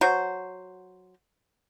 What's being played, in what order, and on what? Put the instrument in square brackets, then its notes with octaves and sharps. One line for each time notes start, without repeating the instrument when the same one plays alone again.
[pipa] F#3 F#4 C5